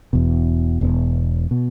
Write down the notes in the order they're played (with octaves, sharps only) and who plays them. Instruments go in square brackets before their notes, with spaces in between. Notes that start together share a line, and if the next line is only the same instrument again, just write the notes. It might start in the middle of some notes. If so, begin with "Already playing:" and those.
[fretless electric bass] E1 E2 B2
E1 E2 B2
B2